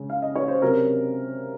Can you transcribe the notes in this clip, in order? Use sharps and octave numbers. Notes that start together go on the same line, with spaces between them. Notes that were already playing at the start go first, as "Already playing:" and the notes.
Already playing: C#3 G#3 C#4
F5
D#5
C#5
C5
C3 F#3 C#4 A#4